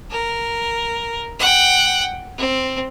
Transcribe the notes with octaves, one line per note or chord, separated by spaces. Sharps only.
A#4
F#5 G5
C4